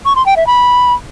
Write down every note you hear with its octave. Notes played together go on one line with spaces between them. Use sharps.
C#6
C6
G5
E5
B5